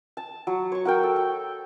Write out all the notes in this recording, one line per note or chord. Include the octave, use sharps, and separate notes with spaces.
A5
F#3
C#5 C#6
F#4 A#4 G5
A4
G5